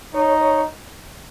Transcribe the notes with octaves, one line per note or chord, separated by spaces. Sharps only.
D#4 C#5
C#5